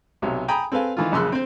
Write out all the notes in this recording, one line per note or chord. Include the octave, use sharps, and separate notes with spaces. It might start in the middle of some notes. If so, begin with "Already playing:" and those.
B1 C3 F#3
G5 G#5 A#5 B5 D#6
C4 A4 B4 F5 G#5
D#3 E3 F4
A#1 F#2 C#3 C6 E6 F#6
C4 C5